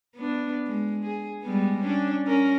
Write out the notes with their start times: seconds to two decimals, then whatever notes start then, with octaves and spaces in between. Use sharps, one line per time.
0.15 B3 D4
0.67 G#3
1.03 G#4
1.42 G3 G#3 B3
1.83 C#4 D4
2.27 C#4 A#4